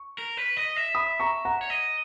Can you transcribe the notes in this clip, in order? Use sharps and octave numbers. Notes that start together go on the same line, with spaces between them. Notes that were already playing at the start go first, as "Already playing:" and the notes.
Already playing: C#6
A#4
B4
D#5
E5
B5 D#6
A#5 C#6
F#5 A#5
C#5
D#5